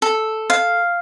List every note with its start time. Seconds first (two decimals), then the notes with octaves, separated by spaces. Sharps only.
0.02 A4
0.50 F5